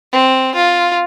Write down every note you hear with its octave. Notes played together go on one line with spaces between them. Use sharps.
C4
F4